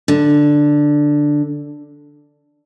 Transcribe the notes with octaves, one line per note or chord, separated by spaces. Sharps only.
D3